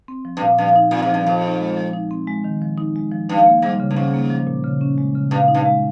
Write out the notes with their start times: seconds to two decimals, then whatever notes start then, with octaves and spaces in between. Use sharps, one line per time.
0.08 C4
0.25 F3
0.37 G2
0.42 A#2
0.58 G2 F3
0.76 D#4
0.91 A#2 C4
1.02 G#2
1.09 G2 F3
1.26 F2 F3
1.44 D#4
1.60 G#3
1.77 F3
1.93 D#4
2.11 C4
2.27 G#3
2.44 D#3
2.62 F3
2.78 D#4
2.96 G#3
3.12 F3
3.29 G2 D#4
3.46 A#3
3.62 G#2 G3
3.80 C#3
3.91 G2
3.96 G#2 C#4
4.14 A#3
4.30 F3
4.47 A#2
4.64 C#3
4.81 C#4
4.98 G#3
5.15 C#3
5.31 G2 A#2
5.48 D#4
5.54 G2
5.66 G#3